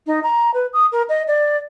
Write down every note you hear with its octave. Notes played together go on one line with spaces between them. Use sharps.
D#4
A#5
B4
D#6
A#4
D#5
D5